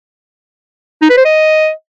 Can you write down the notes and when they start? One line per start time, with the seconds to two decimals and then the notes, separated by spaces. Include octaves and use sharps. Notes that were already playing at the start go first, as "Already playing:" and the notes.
1.02 D#4
1.10 B4
1.17 C5
1.25 D#5